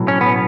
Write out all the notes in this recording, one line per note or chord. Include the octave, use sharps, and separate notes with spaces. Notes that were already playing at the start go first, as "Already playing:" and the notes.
Already playing: B1 A2 F#3
C#4
B3